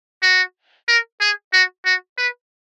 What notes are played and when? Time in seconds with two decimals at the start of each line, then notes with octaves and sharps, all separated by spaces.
0.23 F#4
0.88 A#4
1.20 G#4
1.53 F#4
1.85 F#4
2.18 B4